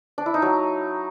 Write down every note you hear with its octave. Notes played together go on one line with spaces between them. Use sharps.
D4
E4
D#4
F#3